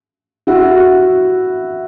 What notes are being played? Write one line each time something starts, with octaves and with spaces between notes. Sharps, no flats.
E4 F#4